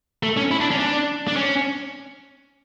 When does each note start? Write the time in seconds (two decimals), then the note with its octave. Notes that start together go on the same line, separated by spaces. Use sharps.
0.23 A3
0.37 C#4
0.51 E4
0.60 D4
0.71 C#4
0.79 D4
1.28 D4
1.36 C#4